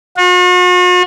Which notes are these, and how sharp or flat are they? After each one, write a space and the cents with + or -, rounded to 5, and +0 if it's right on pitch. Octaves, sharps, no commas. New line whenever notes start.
F#4 -45